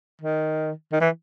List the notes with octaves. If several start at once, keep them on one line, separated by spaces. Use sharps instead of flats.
D#3
D#3
E3